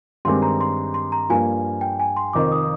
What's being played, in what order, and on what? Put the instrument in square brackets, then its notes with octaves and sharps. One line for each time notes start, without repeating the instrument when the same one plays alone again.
[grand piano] G2 D#3 G#3 C4 G4 [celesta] C6
[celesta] A#5
C6
C6
A#5
[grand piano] G2 F3 A#3 [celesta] G#5
[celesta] G5
G#5
C6
[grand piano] F1 F2 D#3 [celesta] D6
[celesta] D#6